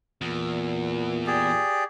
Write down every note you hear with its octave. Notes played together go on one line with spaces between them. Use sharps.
E2 A#2
G4 G#4 D5